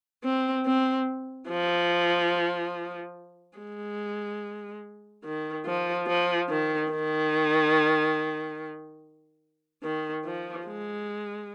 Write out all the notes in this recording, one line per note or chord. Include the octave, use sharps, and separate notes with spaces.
C4
C4
F3
G#3
D#3
F3
F3
D#3
D#3
D#3
F3
G#3